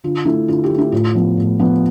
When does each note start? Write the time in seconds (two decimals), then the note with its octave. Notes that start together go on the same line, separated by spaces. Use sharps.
0.04 D3 F4
0.25 A3 E4
0.48 D3 F4
0.64 G4
0.70 A3
0.78 E4
0.92 A2 F4
1.15 F3 B3
1.37 A2
1.59 F3 B3